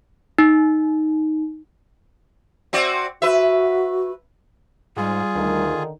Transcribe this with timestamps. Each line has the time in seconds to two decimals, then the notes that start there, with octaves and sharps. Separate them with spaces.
0.38 D#4
2.73 C4 F#4 D5
3.22 F#4 B4 E5
4.97 G#2 G3 F4 G#4
5.35 D2 D3 D#3